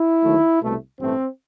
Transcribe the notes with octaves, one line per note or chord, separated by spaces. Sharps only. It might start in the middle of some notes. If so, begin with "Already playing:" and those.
Already playing: E4
D#2 D#3 F#3 A3
C2 B2 A3
A1 G2 E3 A3 C4